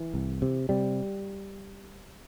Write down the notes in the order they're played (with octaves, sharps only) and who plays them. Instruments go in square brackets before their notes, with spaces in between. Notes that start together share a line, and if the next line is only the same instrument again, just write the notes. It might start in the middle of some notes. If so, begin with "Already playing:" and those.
Already playing: [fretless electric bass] E3
C2
C3
C3 G3